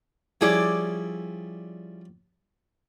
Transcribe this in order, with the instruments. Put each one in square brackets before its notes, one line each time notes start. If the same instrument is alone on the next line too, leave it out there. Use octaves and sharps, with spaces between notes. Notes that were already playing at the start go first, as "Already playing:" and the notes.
[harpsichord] F3 G3 C#4 [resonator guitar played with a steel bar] E4 G#4 D5